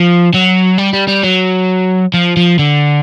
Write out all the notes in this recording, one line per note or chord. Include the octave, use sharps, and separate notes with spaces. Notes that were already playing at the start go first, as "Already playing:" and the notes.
Already playing: F3
F#3
G3
G3
G3
F#3
F3
F3
D3